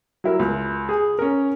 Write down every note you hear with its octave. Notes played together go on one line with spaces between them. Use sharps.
F#3 E4 A#4
C#2
G#4
C#4 A#4